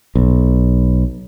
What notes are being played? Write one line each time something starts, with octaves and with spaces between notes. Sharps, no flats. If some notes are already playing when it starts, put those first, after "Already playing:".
B1